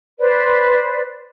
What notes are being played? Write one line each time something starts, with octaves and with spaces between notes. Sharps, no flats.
B4 C5 D5